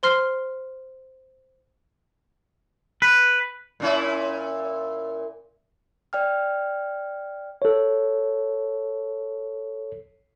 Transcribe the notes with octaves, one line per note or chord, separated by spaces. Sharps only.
C5 C6 F6 C7
B4
A#2 C#4 E4
D5 G5 F6
A4 C#5